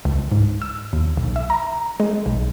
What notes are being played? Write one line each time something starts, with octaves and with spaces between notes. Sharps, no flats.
C#2
G#2
E6
D#2
B1
E5
A#5
G#3
B1